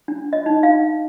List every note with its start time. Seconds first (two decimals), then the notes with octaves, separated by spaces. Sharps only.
0.08 D4
0.33 D#5
0.46 D#4
0.63 F5